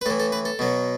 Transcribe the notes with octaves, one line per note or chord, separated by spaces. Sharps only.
B4
A2 E3 A4
A4
B4
A4
B2 F#3